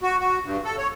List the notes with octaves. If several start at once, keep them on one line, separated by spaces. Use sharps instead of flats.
F#4
F#4
G2
A4
C#5